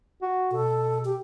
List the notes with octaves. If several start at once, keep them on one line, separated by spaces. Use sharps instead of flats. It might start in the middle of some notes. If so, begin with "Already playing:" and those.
F#4
B2 A4
G4